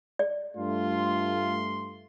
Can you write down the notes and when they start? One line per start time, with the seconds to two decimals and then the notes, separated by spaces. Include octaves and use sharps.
0.19 D5
0.57 G2 A3 F4 C6